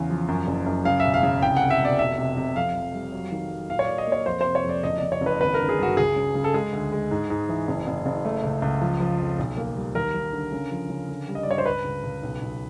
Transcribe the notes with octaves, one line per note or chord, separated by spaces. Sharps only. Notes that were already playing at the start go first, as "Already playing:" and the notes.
Already playing: E2 C#3
F3
F#2
F#1
F#2
C#3 F5
E1 E5
F5
C#3
C2 G5
C2 F#5
E5
B2 D5
F1 E5
C3
C3
F2 F5
F2
G3
F#3
D#3
F#3
A#2 F5
C#5
A#2 D5
D#5
A#3 C#5
F2 C5
C3 C5
C#5
F2
D5
F#1 D#5
F#1 D5
C#5
F#1
B4
G#1 B4
A#4
D3
G#4
G2 F#4
C#2 G#4
C#3
C#3
A4
G#3 G#4
D2
G#3
G#2
G#2
E3
F#1
F#1
F#1
A3
C#2
C#2
F3
F3
F2
B1
A#3
G3
D#2 A#4
D#2
D3
C#3
F3
C#3
D3
G3
D#5
D5
G2 C#5
C5
C#2 B4
C#2
C#2
B1
B1